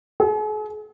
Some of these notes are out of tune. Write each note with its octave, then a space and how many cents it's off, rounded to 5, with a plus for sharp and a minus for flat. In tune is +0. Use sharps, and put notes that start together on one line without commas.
G#4 +45